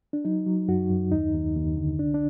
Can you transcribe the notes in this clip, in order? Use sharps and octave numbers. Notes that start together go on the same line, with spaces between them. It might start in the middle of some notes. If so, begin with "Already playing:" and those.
D4
F#3 D#4
F#3
F#2 F#4
F#2
D#2 D#4
D#2
D#2
D3
C2 D4
D4